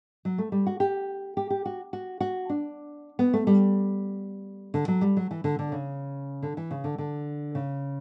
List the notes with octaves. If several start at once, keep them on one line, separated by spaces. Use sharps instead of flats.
F#3
A3
G3
F#4
G4
G4
G4
F#4
F#4
F#4
D4
B3
A3
G3
D3
F#3
G3
F#3
E3
D3
D3
C#3
D3
E3
C#3
D3
D3
C#3